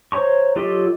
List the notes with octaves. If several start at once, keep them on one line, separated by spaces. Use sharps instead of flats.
C5 C#5 A#5 C#6
F#3 F4 G4 A4 D#5